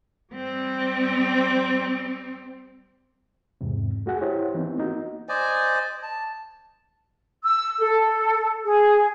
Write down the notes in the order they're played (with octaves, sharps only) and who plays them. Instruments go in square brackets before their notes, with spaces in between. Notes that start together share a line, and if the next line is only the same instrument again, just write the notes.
[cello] G3 C4
[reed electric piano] E2 G#2 C3
A3 F#4 G#4 F#5 G#5
E4 G4 C5 C#5
E3 B3 C4 D#4
A#3 D#4 F#4
[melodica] C5 D5 D#5 G#5
A5
[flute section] E6
A4
G#4